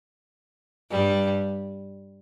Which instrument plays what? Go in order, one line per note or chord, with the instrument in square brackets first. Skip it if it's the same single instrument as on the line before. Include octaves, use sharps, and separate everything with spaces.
[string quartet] G2 G3